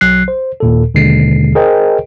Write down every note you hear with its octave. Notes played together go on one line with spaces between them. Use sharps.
B1 F#3 F#6 C7
C5
D#2 A#2 A4
D#2 B2 D3 G#3 C7
G#4 A#4 C5 D#5 G5